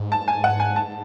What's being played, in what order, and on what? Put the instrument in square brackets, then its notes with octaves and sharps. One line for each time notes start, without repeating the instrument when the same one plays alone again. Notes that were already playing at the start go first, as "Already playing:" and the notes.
Already playing: [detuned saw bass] G#2
[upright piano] A5
G#5
F#5
G#5
A5